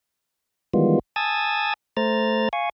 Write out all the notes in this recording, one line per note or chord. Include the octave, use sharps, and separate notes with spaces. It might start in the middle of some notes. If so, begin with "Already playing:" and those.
D#3 E3 G3 G#3 B3 F4
G#5 A5 D#6 E6 G#6 A6
A3 C5 A#5 F6 A6
F5 G#5 C#6